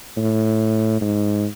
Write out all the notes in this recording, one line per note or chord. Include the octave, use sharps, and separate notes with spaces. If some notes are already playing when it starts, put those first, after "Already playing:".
A2
G#2